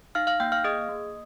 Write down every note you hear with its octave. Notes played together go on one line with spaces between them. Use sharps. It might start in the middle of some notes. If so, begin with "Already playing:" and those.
D#4 F5 F6
F5 F6
A#3 G5 G6
F5 F6
G#4 D#5 D#6
A#3